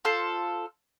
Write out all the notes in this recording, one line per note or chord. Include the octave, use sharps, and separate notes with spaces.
F4 A4 C5